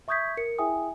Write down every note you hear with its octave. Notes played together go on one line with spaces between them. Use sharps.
E5 C#6 D#6 G6 G#6 B6
A#4 C#7
E4 G#4 E5 G5 G#5 D#6